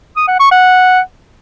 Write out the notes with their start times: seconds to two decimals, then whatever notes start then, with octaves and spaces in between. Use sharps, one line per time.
0.16 D#6
0.28 F#5
0.40 C#6
0.51 F#5